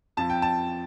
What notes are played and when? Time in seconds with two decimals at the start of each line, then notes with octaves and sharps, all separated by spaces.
0.17 F2 F3 C4 A5
0.30 G5
0.42 A5